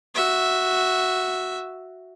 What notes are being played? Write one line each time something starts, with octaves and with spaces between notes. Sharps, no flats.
F#4 E5